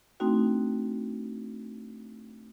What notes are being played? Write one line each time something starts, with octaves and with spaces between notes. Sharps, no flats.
A3 C4 D4 D#4 F#4 G5